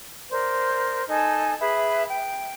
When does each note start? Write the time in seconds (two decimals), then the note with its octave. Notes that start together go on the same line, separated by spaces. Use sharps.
0.30 A#4 C5 D5
1.08 D#4 A4 G#5 A5
1.60 G#4 B4 E5
2.10 G5